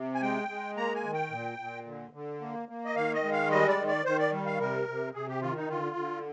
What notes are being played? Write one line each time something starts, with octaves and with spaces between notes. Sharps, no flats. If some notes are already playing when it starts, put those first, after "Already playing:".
Already playing: C3
G#5
G#3 G5
G#3
A#3 A#5
G#5
D#3
G5
A#2
A#2
D3
D3
A#3
A#3
D#5
D#3 F5
D#5
G#3
F5
G3 D#5
D5
D#3
D5
D#3 C5
D5
G3
F5
C3 A#4
C3
C3 G#4
G4
D#3 F4
D#4
D3 F4
D3